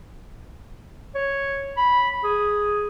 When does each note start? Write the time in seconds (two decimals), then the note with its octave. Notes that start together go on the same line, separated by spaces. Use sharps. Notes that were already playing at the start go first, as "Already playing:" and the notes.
1.15 C#5
1.77 B5
2.24 G#4